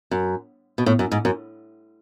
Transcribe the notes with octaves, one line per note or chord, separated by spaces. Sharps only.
F#2
B2
A2
F#2
G#2
F#2